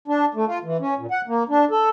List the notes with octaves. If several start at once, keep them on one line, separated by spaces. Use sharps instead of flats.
D4
A3
F4
E3
C#4
A#2
F#5
A#3
D4
A4